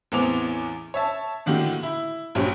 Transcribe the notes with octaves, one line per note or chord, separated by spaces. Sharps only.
A1 E2 E3 C4 D6 F7
C#5 E5 A5
A2 D3 D#3 A#3 F#4 G4
E4
A#1 G2 F#3 C#4 G4